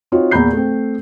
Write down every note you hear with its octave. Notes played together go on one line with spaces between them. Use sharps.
C4 D#4 F4 F#4 C#5
E2 A#2 A#5 B5 G6 C7
A3 C4